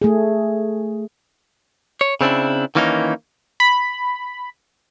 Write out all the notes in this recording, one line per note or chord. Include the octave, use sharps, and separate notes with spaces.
A3 G#4
C#5
C#3 C4 D4 E4
D#3 E3 A#3 C#4 D#4
B5